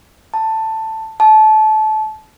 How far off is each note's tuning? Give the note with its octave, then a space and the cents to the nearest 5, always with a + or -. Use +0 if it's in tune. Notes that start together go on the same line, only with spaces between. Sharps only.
A5 +10
A5 -25